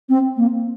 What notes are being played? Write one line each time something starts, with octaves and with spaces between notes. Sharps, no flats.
C4
A#3